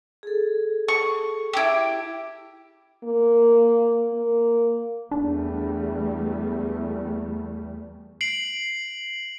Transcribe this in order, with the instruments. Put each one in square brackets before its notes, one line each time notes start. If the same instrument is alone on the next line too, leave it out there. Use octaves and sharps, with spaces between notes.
[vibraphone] G#4 A4
[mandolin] C#6
E4 G4
[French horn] A#3
A#3
[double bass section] E2 G3 A3 [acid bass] D4
[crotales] C7 D7 F#7